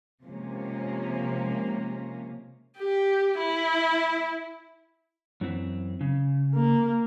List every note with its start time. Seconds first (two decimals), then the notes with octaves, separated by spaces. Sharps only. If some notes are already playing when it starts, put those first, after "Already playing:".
0.23 C3 F3 G#3 A#3 C#4
2.78 G4
3.39 E4
5.41 F#2 E3 C4
6.01 C#3
6.55 A#3